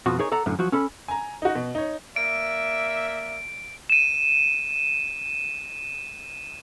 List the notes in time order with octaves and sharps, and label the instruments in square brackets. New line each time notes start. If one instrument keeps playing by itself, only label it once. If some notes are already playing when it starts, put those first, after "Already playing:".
[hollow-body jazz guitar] F2 B2 F3 F#4
D#4 G#4 A#4 C#5
A4 D5 F#5 A#5
F#2 A2 D3
F3 F#3 F#4
C#4 A4 B5
[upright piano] G#5 A#5
D#4 F#4
B2
D#4 C#5
[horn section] A#3 D5 E5 [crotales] D7
[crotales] D#7 E7